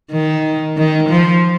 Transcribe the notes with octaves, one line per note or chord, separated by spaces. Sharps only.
D#3
D#3
F3